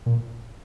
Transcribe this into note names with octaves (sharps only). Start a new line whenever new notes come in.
A#2